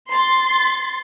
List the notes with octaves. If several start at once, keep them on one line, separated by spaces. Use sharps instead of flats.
C6 A6